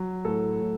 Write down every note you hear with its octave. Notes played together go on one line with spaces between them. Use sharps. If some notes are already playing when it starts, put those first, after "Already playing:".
Already playing: F#3
A2 A4
A2